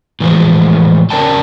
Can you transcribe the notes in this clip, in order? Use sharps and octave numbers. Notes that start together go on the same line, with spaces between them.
A2 E3 F3 G#3
C#4 A#4 C#5 D5 G5 A5